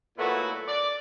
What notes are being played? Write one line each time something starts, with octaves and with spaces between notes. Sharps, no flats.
A#2 F#3 A3 B3 E4 F#4
D5